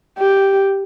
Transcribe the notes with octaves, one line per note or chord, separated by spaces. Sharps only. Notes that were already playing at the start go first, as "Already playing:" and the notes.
G4